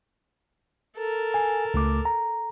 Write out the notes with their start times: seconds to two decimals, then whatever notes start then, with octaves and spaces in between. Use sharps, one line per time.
0.97 A4 A#4
1.34 G#5
1.74 C#2 A3 D6
2.05 A#5